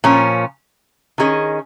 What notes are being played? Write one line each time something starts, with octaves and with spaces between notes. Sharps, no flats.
A#2 F3 C#4
D#3 C#4 G#4 D#5